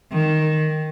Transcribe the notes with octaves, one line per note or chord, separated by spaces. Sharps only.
D#3